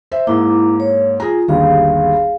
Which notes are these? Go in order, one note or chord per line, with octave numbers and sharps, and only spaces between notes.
C5 E5
G#2 A#3 E4 A#5 D6
C#5
F4 G#4 A#5
G1 D#2 G3 G#4 F5